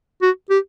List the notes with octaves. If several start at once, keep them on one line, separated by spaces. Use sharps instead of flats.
F#4
G4